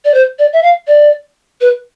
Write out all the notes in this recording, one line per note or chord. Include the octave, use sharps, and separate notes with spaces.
D5
C5
D5
E5
F5
D5
B4